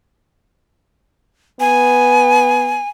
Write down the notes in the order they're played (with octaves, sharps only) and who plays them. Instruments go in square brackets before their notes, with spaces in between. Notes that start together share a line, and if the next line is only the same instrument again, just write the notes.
[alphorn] B3 [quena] G#5